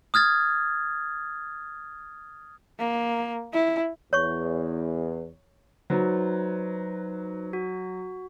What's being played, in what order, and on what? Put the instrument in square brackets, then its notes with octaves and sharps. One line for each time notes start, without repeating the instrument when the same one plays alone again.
[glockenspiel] D#6 F6 G#6 A6
[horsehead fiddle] A#3
E4
[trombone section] E2 [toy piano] C#5 C#6
[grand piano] F#3 [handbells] D#4 B4 C5
[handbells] F#4